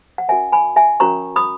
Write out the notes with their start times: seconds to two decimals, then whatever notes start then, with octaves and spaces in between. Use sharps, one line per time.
0.18 F#5
0.28 C#4 F#4 A#4 C#5 E5 G#5
0.52 G#5 B5
0.76 E5 G#5
1.00 C#4 F#4 A#4 C#5 A#5 C#6
1.36 B5 D#6